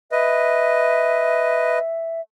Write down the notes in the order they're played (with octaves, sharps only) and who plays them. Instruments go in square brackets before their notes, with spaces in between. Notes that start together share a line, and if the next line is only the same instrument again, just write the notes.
[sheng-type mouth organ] B4 D#5 [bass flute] E5